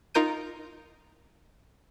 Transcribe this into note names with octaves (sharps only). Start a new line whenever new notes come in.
D#4 F4 A#4 G6 D#7